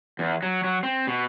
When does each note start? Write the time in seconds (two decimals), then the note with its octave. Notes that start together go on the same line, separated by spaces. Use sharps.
0.19 E2
0.43 F#3
0.64 F#3
0.83 C4
1.07 B2